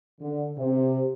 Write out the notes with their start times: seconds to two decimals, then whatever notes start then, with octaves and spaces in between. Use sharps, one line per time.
0.21 D3
0.58 C3